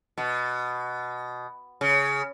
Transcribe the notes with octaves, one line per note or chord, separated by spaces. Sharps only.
B2
C#3